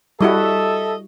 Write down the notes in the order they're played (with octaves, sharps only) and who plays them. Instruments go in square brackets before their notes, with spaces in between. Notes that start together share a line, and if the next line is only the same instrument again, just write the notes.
[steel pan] G3 E4 F#4 [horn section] A4 D#5 E5